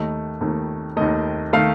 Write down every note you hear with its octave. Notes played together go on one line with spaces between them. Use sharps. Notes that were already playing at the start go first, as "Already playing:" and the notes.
Already playing: D#2 D#3 A3 D#5
D#2 D#3 A3
D#2 D#3 A3 D#5
D#3 A3 F5